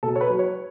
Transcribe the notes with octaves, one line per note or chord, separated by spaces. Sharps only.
B2 A4
C#5
B4
F#3
C#5